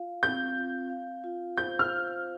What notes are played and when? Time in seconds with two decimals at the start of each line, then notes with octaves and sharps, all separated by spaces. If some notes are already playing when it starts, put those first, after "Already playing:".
Already playing: F4 F5
0.23 C4 G6
0.56 F4
0.90 F5
1.24 F4
1.57 C5 G6
1.79 F6
1.91 F5